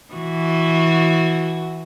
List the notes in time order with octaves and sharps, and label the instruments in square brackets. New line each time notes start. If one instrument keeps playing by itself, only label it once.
[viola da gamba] E3 F#4